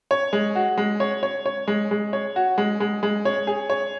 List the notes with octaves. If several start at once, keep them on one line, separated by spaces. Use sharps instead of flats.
C#5
G#3
F#4
G#3
C#5
C#5
C#5
G#3
G#3
C#5
F#4
G#3
G#3
G#3
C#5
G#4
C#5